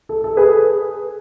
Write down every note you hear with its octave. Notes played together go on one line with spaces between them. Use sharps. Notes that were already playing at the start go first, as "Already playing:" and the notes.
A4
A4
G#4 B4